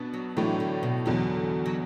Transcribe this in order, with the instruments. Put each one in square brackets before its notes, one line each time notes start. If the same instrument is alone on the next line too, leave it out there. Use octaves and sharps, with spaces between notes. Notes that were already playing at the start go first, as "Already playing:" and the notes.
Already playing: [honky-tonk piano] B2 B3 D4
[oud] F#3
[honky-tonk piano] A2 F#3 A3 D4 [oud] E3
[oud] D3
B2
[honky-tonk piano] E2 B2 F#3 [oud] D3
[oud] F#3